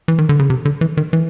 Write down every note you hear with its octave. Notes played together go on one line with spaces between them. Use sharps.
E3
D#3
D3
C#3
C3
D3
E3
D#3
E3